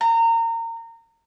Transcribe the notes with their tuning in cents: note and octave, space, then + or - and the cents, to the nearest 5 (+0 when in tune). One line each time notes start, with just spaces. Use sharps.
A#5 -25